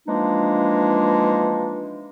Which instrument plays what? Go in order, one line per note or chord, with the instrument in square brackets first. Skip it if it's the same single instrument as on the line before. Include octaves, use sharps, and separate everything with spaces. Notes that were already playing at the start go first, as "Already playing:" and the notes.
[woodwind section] E3 F3 G#3 A#3 D4 D#4